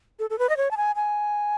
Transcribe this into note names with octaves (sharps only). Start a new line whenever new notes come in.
A4
A4
B4
D#5
C#5
A5
G#5
G#5